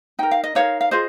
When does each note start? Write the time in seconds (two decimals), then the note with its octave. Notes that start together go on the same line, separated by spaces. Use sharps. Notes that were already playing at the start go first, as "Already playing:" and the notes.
0.19 D#4 A#4 G5
0.31 F5
0.44 D#5
0.55 D#4 A#4 C#5 F5
0.81 F5
0.91 F4 G#4 C5 D#5